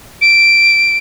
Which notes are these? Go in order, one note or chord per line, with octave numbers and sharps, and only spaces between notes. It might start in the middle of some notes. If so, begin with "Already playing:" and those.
D7